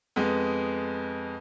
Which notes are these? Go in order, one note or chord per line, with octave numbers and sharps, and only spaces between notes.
F2 G#3 B3